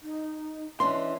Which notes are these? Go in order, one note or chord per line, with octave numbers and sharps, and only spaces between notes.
D#4
E3 C#4 D4 D#5 C6